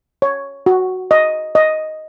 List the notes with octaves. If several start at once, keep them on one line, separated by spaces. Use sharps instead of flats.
C#5
F#4
D#5
D#5